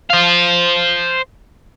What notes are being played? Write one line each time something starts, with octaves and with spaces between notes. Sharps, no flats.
C5 F5